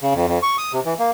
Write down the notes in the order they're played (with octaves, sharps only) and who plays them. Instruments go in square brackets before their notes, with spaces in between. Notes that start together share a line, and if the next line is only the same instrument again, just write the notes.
[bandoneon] C#3
F2
F2
C#6
D#6
C3
E3
A#3